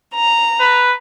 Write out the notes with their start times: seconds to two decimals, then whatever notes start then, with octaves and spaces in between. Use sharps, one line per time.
0.14 A#5
0.60 B4